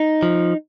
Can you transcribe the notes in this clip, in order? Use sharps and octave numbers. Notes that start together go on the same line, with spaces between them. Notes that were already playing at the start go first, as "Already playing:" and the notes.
Already playing: D#4
F3